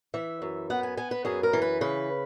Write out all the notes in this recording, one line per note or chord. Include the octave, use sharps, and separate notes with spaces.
E3 E5
F#2
B3 F#5
G#5
B3 G#5
B4
F#2 G#4
A#4
E3
B4
C#3 B4